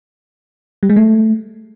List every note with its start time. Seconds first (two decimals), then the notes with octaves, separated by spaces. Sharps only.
0.83 G3
0.89 G#3
0.96 A3